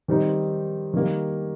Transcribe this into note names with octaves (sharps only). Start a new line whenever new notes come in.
D#3 G3 C4 D#4
D#3 G3 A#3